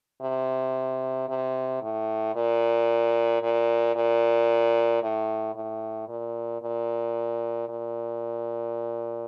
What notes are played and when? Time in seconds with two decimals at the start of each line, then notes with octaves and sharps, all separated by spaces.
0.22 C3
1.28 C3
1.82 A2
2.35 A#2
3.42 A#2
3.95 A#2
5.03 A2
5.55 A2
6.08 A#2
6.62 A#2
7.69 A#2